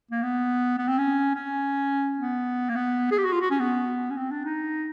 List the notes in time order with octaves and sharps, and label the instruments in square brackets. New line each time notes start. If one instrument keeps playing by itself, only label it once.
[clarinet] A#3
B3
B3
C4
C#4
C#4
B3
A#3
B3
G#4
G4
F#4
F4
F#4
C#4
B3
C#4
C4
D4
D#4